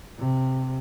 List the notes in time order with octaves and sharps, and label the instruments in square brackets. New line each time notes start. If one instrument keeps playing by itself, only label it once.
[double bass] C3